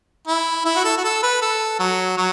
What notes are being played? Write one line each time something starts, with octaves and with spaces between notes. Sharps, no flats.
E4
E4
F#4
A4
F#4
A4
B4
A4
F#3
F#3